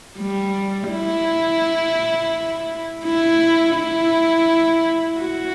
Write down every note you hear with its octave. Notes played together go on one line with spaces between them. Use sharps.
G3
E4
E4
E4
F#4